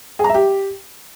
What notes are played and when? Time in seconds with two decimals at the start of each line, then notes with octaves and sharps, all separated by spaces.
0.19 G#4
0.24 A#5
0.29 E5
0.34 G4